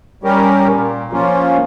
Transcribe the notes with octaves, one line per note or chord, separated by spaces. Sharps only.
G3 C#4 G4 A#4
A#2
F3 A#3 C#4 F4